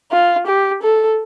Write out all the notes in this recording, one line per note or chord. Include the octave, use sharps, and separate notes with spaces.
F4
G4
A4